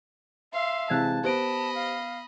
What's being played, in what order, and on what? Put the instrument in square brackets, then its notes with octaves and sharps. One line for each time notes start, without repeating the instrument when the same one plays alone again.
[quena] E5 [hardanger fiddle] F5 C6
[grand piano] C3 E3 G#3 [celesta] F5 F#6 G#6 [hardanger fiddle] A5
[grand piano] B3 [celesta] G4 C5 D7 [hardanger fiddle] D#5 B5 [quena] A5
[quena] F5